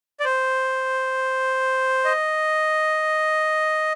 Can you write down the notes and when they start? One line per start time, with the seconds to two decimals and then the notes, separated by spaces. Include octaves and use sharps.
0.20 D5
0.25 C5
2.05 D#5